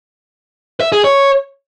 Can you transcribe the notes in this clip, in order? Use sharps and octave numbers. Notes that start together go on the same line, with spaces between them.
E5
G#4
C#5